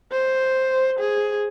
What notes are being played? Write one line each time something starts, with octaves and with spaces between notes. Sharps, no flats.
C5
G#4